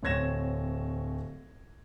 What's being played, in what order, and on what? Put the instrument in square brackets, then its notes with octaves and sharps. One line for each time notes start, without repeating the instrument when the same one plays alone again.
[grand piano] D1 C4 C#5 G#6 A#6 E7